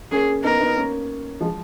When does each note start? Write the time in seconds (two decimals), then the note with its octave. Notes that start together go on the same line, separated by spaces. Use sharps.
0.11 A#3 C#4 G#4
0.44 B3 D#4 A#4
0.60 B3 D#4
0.76 A#3 C#4
1.41 F3 G#3